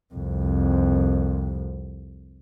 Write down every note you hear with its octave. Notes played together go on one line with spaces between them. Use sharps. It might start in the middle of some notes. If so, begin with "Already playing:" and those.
C2 F2